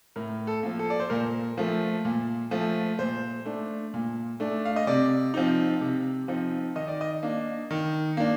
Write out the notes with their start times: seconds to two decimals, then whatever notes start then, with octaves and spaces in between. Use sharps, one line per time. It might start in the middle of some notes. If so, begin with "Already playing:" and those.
0.16 A2 A#4
0.47 A4
0.63 F3 A#3
0.79 A4
0.90 D5
1.00 C5
1.10 A#2 A#4
1.58 F3 A3
2.05 A#2
2.51 F3 A3
2.99 A#2 C5
3.45 A3 D4
3.94 A#2
4.40 A3 D4
4.65 F5
4.76 D#5
4.87 C3 D5
5.34 F3 C4 D#4
5.81 C3
6.28 F3 C4 D#4
6.75 D#3 D#5
6.88 D5
7.01 D#5
7.23 A#3 D4
7.71 D#3
8.17 A#3 D4